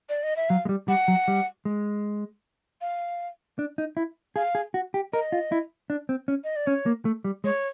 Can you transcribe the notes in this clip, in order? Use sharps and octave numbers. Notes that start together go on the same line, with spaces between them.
D5
D#5
E5
F#3 F5
G#3
G3
G3 F#5
F#3
G3
G#3
F5
D4
D#4
E4
G#4 F5
G#4
F#4
G4
A#4 D#5
F4
E4
D4
C4
C#4
D#5
D5
C#4 C#5
A#3
A3
G3
G#3 C#5